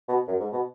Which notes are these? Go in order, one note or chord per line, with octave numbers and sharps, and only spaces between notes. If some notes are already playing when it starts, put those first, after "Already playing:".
B2
F#2
G#2
B2